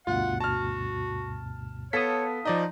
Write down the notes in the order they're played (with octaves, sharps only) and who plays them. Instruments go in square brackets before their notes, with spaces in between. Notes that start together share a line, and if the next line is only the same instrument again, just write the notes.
[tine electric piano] D2 G2 B2 [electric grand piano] F4 [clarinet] F#5
[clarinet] F#4 [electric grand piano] A5 F6
[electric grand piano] B3 A4 B6 [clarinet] C#5 [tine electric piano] F5 A5 D#6
[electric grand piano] F3 D5 D#5 [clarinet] D#4